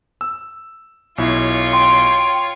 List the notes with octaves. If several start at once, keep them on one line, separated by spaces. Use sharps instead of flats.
E6
B1 E4 F4 C#5
G5 C6